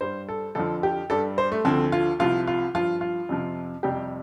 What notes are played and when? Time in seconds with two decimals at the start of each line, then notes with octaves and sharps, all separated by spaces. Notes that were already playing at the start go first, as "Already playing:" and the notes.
0.01 G2 G3 C5
0.29 A4
0.55 F2 D3 F3 A4
0.83 G4
1.10 G2 G3 A4
1.38 C5
1.52 A3
1.65 D2 D3 F3 C4
1.92 F4
2.19 C2 C3 F3 F4
2.47 F4
2.75 G2 F3 F4
3.01 F4
3.29 F2 C3 F3
3.83 F2 C3 G3 G4